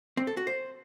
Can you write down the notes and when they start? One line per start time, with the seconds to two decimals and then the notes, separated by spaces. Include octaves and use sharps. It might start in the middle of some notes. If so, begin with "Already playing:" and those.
0.17 C4
0.27 A4
0.37 F#4
0.47 C5